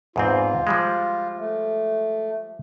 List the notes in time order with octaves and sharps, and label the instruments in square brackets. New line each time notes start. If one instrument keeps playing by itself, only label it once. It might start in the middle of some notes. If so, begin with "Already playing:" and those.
[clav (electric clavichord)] E2 G#2 C4 [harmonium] F4
[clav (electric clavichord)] F3 G3 G#3
[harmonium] A3